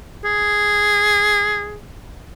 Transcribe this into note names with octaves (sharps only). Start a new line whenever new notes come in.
G#4